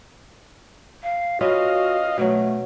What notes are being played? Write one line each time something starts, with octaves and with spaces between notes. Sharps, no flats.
F5
C#4 F4 F#4 B4 D#5 F5
B2 F#3 A3